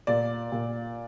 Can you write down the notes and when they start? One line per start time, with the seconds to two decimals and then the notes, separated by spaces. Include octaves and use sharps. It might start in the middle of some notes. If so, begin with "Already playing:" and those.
0.07 A#2 D5
0.52 A#2